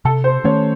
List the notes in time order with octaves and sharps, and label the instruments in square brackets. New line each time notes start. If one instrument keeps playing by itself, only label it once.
[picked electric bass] C3 [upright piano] A4
[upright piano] C5
[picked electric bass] D#3 A3 C#4 [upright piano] C#5